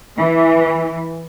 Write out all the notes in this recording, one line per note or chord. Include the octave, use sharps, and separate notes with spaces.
E3